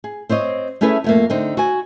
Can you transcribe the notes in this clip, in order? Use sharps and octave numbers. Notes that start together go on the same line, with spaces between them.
G#4
C4 C5 C#5 D#5
A3 C#4 E4 G#4 A4 B4
F2 A3 A#3
D3 C4 D#4
F#4 G#5